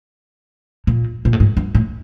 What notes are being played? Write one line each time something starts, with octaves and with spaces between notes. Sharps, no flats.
A#2
A#2
A2
G#2
G2
A2